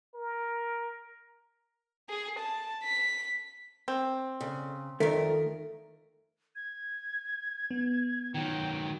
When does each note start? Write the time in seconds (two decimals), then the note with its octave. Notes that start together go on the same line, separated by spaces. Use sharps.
0.15 A#4
2.09 G#4
2.39 A5
2.84 B6
3.88 C4
4.41 C#3
5.00 F2 D#3 A3 A#4
6.56 G#6
7.71 B3
8.34 D#3 F#3 G5